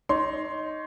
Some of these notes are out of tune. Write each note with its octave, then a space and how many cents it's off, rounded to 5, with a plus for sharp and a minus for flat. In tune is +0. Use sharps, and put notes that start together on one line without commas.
D#4 +0 C#5 +20 C6 +0